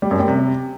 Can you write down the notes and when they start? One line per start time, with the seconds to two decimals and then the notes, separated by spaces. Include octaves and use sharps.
0.02 G3
0.11 F#2
0.19 G3
0.28 C3